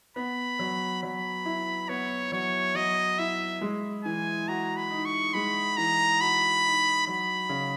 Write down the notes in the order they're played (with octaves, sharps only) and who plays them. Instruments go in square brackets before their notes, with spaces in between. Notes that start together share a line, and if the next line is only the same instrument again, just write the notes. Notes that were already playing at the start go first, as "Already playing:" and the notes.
[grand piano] B3 [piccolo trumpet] B5
[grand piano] F#3
[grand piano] F#3 [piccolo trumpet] B5
[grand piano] E4
[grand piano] B3 [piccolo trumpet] C#5
[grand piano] F#3 [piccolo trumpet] C#5
[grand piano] F#3 [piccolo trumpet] D#5
[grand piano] E4 [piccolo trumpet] E5
[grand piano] G#3
[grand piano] E3 [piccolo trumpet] G#5
[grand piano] F#4 [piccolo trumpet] A#5
[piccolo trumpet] B5
[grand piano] D#4
[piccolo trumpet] C#6
[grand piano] G#3 [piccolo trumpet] B5
[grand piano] E3 [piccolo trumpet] A#5
[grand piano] F#4 [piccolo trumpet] B5
[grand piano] D#4
[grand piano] F#3 [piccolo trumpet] B5
[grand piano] C#3